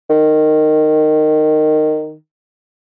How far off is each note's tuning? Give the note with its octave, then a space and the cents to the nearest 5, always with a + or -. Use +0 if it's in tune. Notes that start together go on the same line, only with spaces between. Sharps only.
D#3 -15